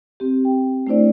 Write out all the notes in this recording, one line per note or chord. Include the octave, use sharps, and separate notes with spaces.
C4 G4
G5
A3 D4 E4 C5 D5